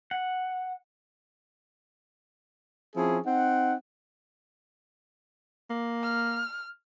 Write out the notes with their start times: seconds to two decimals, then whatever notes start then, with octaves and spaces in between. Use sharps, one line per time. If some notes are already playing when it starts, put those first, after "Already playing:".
0.11 F#5
2.96 F3 C4 C#4 E4 G#4
3.26 C4 D#4 F#5
5.70 A#3
6.03 F6